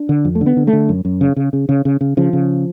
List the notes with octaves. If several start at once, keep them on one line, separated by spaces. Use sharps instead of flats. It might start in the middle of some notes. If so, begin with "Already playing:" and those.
Already playing: D4
D3
F2
A3
D3
B3
D3
A3
D3
F#2
F#2
C#3
C#3
C#3
C#3
C#3
C#3
C#3 F3
C#3